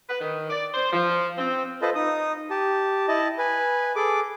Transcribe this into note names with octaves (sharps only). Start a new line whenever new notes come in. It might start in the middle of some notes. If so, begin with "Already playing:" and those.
B4
D#3
D5
C5
F3
C4
F4 A4 B4 C5 D#5
D#4 D#6
G4 A5
E4 D#5 A5
B4 G#5
G#4 A4 D6